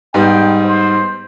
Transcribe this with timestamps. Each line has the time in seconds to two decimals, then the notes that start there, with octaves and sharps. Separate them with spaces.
0.14 G#2 G3 B3 G5
0.64 C5